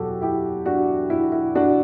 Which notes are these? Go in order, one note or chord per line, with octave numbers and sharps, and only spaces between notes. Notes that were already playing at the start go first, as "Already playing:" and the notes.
Already playing: E2 B2 F#3 F#4 G4 A4
E4 G4
D4 F#4
E4
E4
D4 F#4